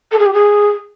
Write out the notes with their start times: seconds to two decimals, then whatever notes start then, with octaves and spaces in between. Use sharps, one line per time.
0.12 A4
0.19 G#4
0.26 G4
0.33 G#4